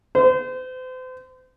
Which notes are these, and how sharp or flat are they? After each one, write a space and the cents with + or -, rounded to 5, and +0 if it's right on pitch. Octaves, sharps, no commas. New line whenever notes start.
C5 -40